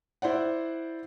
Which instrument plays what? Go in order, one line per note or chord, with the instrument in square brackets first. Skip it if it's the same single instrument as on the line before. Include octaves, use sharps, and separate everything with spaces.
[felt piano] E4 C5 D5 F#5